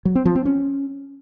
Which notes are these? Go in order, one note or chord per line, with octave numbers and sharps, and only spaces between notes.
F#3
C4
F3
C4
C#4